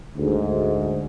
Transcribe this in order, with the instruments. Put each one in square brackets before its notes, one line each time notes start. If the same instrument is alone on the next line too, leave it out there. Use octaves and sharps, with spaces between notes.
[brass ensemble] D2 G#2